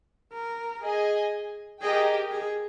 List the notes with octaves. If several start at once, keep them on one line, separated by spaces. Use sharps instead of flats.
A#4
G#4 D#5 G#5
G4 G#4 A#4 D#5 G5
G#4